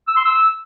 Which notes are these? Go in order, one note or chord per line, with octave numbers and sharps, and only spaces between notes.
E6
C6
E6